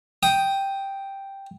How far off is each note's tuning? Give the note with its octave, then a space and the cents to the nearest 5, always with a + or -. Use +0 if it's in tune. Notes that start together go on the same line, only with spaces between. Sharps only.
G5 +0 D#6 +0